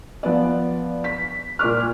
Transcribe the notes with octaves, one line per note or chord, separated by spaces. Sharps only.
F3 B3 D5
B6
A#2 D5 D6 F6